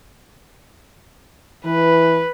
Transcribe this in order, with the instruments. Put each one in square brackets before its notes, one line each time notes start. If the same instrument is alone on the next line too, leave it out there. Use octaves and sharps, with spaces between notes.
[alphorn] E3 [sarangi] B4